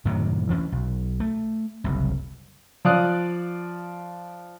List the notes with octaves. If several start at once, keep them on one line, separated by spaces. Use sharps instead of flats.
F#2 A2 C3 D#3
D2 E3 C#4
B1
A3
F#1 C2
F3 D5 F5 D#6 F#6